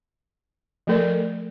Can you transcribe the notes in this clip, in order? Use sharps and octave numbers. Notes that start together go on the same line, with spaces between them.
F3 A3 A4 A#4 D5